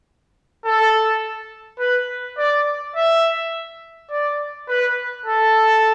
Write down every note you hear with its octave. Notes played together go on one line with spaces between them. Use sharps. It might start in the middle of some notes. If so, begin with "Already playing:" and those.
A4
B4
D5
E5
D5
B4
A4